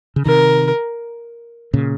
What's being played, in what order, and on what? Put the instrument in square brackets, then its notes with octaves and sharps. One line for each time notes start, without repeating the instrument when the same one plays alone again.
[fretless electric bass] C#3
[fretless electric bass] C3 D#3 [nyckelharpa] A#4
[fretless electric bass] A#2 C#3